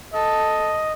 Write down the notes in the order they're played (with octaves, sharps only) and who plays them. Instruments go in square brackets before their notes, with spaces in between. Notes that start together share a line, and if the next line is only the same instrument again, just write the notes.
[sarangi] A4 [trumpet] D#5